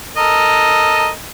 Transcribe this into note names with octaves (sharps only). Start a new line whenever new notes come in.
A4 A#4 D#5